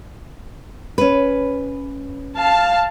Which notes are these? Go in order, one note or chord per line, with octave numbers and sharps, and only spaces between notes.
C#4 B4
F5 A5